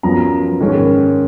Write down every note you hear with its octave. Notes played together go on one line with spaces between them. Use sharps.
F#2 F3 B3 A#5
G#2 D#3 A#3 C#4